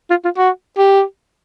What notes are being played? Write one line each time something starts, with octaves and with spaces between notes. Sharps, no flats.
F4
F4
F#4
G4